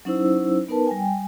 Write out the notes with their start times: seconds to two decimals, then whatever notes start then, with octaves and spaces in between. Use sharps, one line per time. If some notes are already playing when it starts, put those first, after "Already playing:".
0.05 F#3 C#4 D#4 E4 C5 E6
0.68 B3 D#4 A#4 B4 A5
0.87 G3 G5 G#5